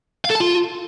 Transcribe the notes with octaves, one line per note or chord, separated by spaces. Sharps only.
F5
A4
A5
F4